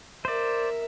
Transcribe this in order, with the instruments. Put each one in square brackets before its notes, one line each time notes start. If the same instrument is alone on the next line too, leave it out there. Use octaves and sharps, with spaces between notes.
[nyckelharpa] A#4 E5 [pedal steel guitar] C5 D5